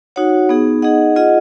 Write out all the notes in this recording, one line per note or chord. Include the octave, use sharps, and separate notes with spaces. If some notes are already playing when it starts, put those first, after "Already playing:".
D#4 F#4 C#5 F#5
B3 D#4 G#4
D#4 G#4 D#5 F#5
F4 G#4 D#5 F#5